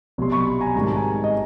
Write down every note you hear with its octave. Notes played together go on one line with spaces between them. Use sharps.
C2 B2 F#3 C6
B5 C#6
G#5 A#5
G#2 D#3 G3 C4 A#5
A5
G#5 A#5
D#5